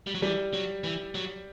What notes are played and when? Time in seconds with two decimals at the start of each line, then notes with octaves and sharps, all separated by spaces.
0.07 G3
0.15 F#3
0.22 E3 G3
0.54 F#3
0.84 E3
1.15 F#3